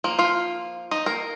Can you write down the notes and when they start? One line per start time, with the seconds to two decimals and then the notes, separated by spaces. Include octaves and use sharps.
0.04 F3 A#3
0.19 F4 F5
0.91 D#4 D#5
1.06 A#3 A#4